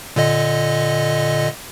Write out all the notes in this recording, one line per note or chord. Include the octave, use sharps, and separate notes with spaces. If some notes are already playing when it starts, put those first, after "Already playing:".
A#2 D3 D#5